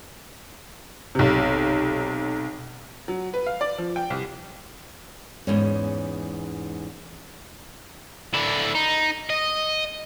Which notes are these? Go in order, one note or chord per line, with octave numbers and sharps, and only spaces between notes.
B1 C3
F#3
B4
F5
D5
F3
G5
C2
E2 G#2 C#4
D3 E4
D#4
D#5